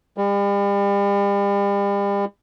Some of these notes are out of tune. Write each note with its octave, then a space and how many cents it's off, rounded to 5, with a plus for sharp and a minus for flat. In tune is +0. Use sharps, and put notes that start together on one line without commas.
G3 +40